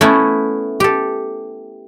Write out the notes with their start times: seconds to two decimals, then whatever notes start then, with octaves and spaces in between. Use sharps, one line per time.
0.01 A3 B3 C#4 E4
0.80 G4 A4